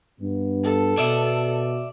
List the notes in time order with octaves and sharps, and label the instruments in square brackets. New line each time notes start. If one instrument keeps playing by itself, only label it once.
[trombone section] G2 B3
[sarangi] A4
[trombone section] B2 [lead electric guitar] D5 E5